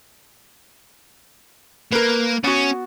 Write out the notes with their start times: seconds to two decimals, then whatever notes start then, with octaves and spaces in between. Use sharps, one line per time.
1.92 A#3 A#4 B4
2.44 B3 C#4 F#4